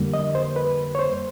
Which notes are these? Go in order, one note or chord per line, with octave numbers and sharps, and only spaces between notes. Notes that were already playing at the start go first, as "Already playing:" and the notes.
Already playing: F2 D3 G3 A#3
D#5
C5
B4
C#5
C5